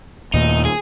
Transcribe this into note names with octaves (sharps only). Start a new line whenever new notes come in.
D#2 A#2 A3 D#4
G#4